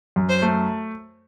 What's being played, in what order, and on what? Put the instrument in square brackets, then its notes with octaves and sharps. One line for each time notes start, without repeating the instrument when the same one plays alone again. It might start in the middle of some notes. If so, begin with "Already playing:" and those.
[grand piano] F#2
[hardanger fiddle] C5
[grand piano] A3